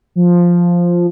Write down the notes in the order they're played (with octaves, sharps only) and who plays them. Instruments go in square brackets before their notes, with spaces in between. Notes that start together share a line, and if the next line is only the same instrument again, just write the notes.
[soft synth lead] F3